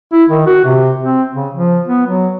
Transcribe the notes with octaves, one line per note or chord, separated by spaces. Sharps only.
E4
D#3
F#4
C3
C4
C#3
F3
B3
F#3